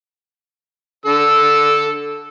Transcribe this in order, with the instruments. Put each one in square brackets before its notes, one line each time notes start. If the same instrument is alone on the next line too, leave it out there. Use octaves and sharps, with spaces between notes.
[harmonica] D3 A4 E6